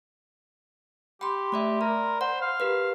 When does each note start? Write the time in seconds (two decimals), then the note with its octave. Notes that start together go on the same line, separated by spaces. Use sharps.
1.21 G4 G5 B5 C6
1.52 A3 D5 E5
1.81 A#4 D5
2.21 C5 F#5
2.41 F5
2.60 G4 A#4 B4